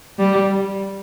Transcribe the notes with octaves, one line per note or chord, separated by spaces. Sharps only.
G3